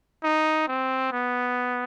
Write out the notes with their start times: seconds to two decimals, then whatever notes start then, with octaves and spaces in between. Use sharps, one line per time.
0.24 D#4
0.67 C4
1.12 B3